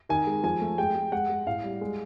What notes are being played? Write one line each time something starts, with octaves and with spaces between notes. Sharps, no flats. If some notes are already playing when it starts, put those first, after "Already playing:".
D#3 G#5
G#3
F3 G#5
A3
G#3 G5
G#3
G#3 F#5
G#3
A2 F5
G3
G#3